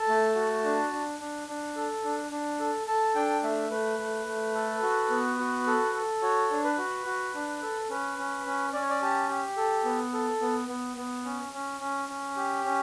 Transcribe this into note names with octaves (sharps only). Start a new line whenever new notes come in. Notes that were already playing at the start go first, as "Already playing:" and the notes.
Already playing: A4 A5
A3
F#4
D4
D4
D4
D4
A4
D4
D4
A4
A4 A5
D4 G5
A3 E5
A3 B4
A3
A3
A4
F#4
B3
F#4
A4
A4
F#4 C#5
D4
B4
F#4
F#4
D4
A4
C#4 B4
C#4
C#4
C#4 D5
C#5
D5
G4 A5
G4
A4
B3
A4
B3
B3
B3
C#4
C#4
C#4
C#4
G4
C#4